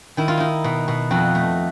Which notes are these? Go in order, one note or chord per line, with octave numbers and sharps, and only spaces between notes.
D#3 E4
F4
D#4 E4
B2
B2
F2 F#4
A3